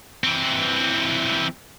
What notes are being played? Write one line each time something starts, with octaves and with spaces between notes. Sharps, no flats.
E3 C4